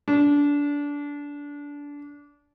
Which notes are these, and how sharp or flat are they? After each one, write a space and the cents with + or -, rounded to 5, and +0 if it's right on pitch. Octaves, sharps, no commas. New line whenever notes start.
D4 -25